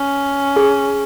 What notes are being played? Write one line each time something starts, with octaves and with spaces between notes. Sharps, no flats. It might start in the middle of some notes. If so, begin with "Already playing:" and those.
Already playing: C#4
G#4